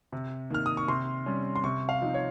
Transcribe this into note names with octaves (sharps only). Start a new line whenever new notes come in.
C3
D#3 A#3 F6
D#6
C#6
C3 C6
G3 C#4
C6
C3 C#6
F5
F3 C4 D#4
C#5